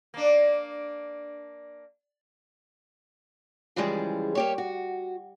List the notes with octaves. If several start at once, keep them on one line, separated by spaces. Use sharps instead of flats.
A#3 D4
C#3 E3 F3 G3 G#3 G#4
A#3 G4 C#5
F#4